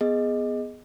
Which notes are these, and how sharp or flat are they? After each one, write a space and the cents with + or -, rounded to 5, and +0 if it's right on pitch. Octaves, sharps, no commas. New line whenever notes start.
B3 +0 G#4 +0 D#5 +0